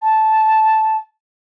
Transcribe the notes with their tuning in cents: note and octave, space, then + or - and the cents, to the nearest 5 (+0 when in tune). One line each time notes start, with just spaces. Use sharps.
A5 -10